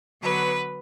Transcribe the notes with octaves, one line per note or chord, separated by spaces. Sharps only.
D3 F#3 B3 B4